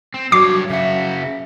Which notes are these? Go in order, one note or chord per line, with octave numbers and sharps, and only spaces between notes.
C4
G2 F#3 F#4 C#5 D6 C7
C#3 F#4 E5